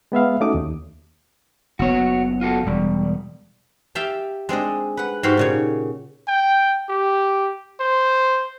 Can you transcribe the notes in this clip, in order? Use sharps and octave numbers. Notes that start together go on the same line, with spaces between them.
G#3 B3 E5 F5
A3 C#4 D#4 F#4 D6 D#6
D#2
F#1 B3 F#4 C#5
F4 F#4 A4
E1 G3
G4 E5 F5 G5 A5
G#3 C4 D4 D#5
B4 F#5
G#2 F#4 G4 C5 F5 B5
A#2 C#3 C#5
G5
G4
C5